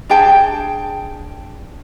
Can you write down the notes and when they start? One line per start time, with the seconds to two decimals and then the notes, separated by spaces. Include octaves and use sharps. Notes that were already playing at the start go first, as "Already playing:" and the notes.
0.09 D4 G#4 G5 A5